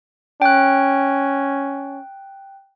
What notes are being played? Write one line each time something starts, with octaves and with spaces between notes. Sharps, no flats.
C#4 G5 F#6